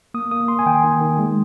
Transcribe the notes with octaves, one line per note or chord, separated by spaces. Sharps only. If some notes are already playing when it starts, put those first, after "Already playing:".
A#3 D#6
A#3 D#6
A#3 C6
G#5
D#3 G5
D#3
D#3
G#3